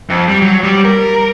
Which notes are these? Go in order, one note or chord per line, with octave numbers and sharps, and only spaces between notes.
F2
G3
F#3
G3
A#4